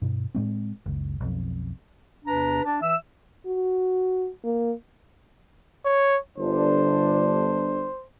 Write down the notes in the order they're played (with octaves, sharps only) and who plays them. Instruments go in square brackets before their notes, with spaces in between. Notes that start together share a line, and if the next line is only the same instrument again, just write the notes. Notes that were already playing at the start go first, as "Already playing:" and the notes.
[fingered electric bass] G2 B2
A2 G#3 C4
F#1 C#2
B1 F2
[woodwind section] E2 C3 D4 B4 A#5
D4
E3 E5 E6
[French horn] F#4
A#3
[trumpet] C#5
[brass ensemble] G1 D4 [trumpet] C5